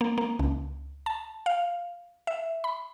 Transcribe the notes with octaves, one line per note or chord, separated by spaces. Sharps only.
A#3
A#3
C#2
A5
F5
E5
B5